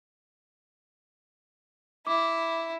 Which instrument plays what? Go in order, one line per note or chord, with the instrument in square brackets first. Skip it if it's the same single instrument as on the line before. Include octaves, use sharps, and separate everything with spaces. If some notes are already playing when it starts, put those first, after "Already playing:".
[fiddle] E4 [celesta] D6